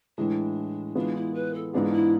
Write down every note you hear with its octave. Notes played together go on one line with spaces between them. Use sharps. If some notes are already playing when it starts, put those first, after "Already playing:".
A2 E3 G#3 D4
E3 G#3 B3 D4 F4
E4
B4
A4
G#2 E3 B3 D4 F4 G#4
E4